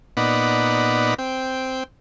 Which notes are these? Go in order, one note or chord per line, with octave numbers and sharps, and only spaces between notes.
A#2 B3 D#4 D5 F#5 B5
C4 G5